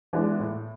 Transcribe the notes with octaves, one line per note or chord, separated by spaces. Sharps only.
E3 G#3 B3 D4
A2